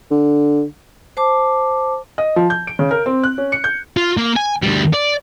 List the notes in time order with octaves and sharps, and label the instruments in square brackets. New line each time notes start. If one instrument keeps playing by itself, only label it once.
[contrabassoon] D3
[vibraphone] C5 A5 D6
[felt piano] D#5
F3
G6
D7
C#3
A#4
C4
F#6
C#4
C#7
G6
[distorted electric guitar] F4
A#3
G#5
D2 G3
D5